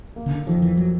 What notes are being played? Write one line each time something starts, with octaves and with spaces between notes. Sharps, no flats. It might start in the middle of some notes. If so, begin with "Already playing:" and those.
A#3
C#3
D3
F2 D#3
E3
F#3